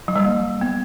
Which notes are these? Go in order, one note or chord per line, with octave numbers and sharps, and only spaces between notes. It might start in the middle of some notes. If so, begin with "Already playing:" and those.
F#3
G3
A#3
B3